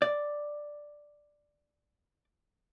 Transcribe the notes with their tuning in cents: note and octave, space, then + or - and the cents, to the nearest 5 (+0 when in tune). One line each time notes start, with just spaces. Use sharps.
D5 +5